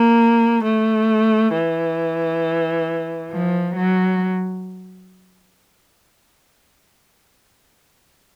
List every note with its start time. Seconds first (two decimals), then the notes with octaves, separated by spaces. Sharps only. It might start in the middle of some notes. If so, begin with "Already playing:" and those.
Already playing: A#3
0.64 A3
1.53 E3
3.31 F3
3.76 F#3